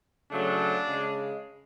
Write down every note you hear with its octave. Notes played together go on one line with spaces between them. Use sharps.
C#3 F#3 A3 D4
C#3 G#3